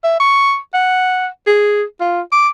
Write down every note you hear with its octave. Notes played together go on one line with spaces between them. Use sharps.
E5
C#6
F#5
G#4
F4
D6